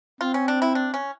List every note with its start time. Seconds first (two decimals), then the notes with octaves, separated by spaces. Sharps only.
0.21 C4 F4
0.34 C#4
0.48 D4
0.62 E4
0.75 D4
0.94 C#4